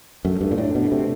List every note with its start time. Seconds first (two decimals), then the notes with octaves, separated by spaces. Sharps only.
0.25 F#2 A3
0.41 G2 A3
0.51 A#2
0.58 A2 D4
0.74 B2 D4
0.91 C3 A3